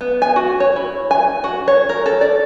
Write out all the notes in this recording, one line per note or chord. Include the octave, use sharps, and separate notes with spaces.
B3
G#5
F#4
C#5
E4
G#5
F#4
C#5
A#4
A4
D5